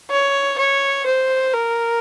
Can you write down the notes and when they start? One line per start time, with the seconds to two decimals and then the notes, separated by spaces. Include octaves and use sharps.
0.10 C#5
0.58 C#5
1.06 C5
1.53 A#4